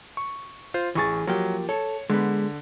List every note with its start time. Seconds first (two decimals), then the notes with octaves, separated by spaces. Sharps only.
0.17 C#6
0.74 F4 C5
0.95 A1 E3 G#4 C#6 A6
1.27 F3 F#3 A#3 G4
1.69 A4 C#5
2.10 D3 G#3 B3